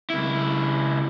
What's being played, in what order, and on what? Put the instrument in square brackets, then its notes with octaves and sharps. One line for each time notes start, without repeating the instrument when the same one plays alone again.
[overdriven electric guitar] C#2 E4